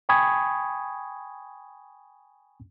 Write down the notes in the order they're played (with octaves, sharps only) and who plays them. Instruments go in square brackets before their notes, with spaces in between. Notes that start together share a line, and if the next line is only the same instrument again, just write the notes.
[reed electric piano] G5 G#5 B5 C#6 D#6 G#6